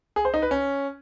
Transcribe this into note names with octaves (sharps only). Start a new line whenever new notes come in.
G#4
C5
D#4
B4
C#4